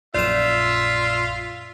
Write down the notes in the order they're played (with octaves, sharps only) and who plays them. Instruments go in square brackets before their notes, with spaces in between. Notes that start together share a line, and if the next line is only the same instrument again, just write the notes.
[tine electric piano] A#1 F#2 A#2 [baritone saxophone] F4 [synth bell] D5 E7 [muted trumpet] E5